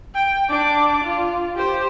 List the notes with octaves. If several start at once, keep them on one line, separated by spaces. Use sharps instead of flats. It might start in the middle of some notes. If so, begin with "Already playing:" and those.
G5
D4 D6
F4
G4 C5